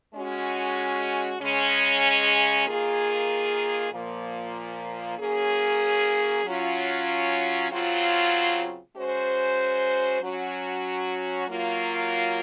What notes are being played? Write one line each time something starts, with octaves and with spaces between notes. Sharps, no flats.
G#3 C#4 F#4
C#3 G#3 C#4
D#3 A#3 F4 G#4
A#2 F3 A#3
F#3 A#3 C#4 G#4
F#3 C#4 F4
C#3 F#3 C4 F4
G#3 C#4 F#4 C5
F#3 C#4 F#4
F#3 A#3 F4